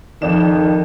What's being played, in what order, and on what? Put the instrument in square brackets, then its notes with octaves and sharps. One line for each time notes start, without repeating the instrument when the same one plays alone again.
[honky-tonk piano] F2 D5 E7 [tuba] D#3